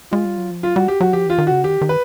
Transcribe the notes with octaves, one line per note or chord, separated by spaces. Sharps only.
G#3 F4
G3
F#3
F3
F#3 F4
G3 F#4
G4
F#3 F#4
F3 G4
E3 F4
D#3
C#3 F#4
D#3 G4
D#3
B4